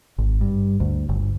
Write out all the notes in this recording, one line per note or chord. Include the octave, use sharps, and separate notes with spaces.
G#1
G2
D2
G1